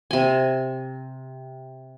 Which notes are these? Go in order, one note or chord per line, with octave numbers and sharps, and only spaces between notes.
C3 G#5